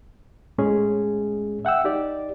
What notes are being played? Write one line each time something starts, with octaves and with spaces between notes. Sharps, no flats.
A2 G#3 C#4 G#4
E5 F#5 G5 E6
D#4 G4 D5